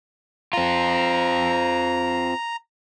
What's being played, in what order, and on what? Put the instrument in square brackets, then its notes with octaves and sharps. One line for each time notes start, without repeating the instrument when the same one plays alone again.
[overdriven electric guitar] C4 F4 [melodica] A#5